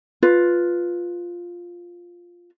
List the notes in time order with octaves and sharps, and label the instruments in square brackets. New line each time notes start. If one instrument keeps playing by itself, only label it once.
[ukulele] F4 B4